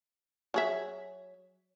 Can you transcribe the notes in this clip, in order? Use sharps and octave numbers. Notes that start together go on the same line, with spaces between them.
F#3 G#4 E5